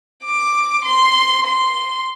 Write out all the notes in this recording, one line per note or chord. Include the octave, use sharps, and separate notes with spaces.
D6
C6
C6